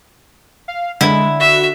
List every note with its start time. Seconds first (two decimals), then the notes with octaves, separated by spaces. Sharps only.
0.68 F5
1.01 D3 G#3 E4
1.40 F#4 E5